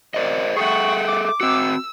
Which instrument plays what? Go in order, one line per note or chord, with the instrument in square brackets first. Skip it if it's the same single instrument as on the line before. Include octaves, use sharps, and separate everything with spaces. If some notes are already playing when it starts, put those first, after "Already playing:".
[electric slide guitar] A#4 C5 D#5 [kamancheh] D5
[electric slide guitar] G#4 A4 E5 [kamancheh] F#5 G5 [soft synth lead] C#6
[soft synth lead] D6
[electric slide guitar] C4 F#4 [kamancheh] E6